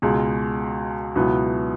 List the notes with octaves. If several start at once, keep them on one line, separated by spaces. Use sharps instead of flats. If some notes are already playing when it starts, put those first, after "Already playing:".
C#2 B2 G#3
C#2 B2 F#3 B3 E4